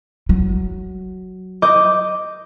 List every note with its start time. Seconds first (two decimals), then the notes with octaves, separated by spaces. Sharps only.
0.29 F#3
1.62 D#5 D6 G6